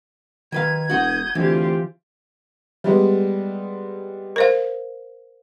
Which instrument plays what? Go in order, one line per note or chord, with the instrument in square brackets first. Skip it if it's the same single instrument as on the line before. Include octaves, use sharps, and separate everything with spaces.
[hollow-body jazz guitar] D#3 B4 F5 [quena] G#6
[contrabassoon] E1 [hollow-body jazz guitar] F#4 F#5 [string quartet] D#6 G6
[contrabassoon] D2 [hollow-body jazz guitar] E3 [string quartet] C4 F4 G4
[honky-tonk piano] G3 G#3 B3
[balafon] A#4 C5 F5